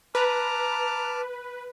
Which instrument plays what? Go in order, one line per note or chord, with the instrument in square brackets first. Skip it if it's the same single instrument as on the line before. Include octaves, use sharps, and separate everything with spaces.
[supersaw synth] B4 [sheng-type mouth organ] A5 D6 F6 [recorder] A#5